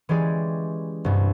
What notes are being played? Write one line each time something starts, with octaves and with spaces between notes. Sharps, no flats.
E3 G#3 C#4 G4 G#4 D5
C2 G2